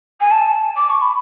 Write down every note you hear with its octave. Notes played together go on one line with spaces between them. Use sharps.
G#5
A5
D6
C#6
B5